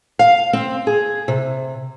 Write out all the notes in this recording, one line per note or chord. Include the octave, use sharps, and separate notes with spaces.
F5
C4
G#4
C3